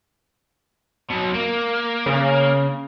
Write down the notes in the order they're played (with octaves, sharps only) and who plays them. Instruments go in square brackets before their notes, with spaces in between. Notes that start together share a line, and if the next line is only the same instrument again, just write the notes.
[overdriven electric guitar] B2 F#3
A#3
[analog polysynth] C#3